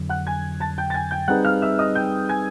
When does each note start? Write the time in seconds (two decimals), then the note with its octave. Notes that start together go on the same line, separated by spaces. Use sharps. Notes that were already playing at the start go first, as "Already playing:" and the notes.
Already playing: F2 D3 F#3
0.09 F#5 F#6
0.27 G#5 G#6
0.60 A5 A6
0.78 G5 G6
0.90 A6
0.94 G#5 G#6
1.11 G5 G6
1.28 G3 C4 D#4 G#4 B4 F#5 F#6
1.45 F5 F6
1.62 E5 E6
1.79 D#5 D#6
1.95 G5 G6
2.29 G#5 G#6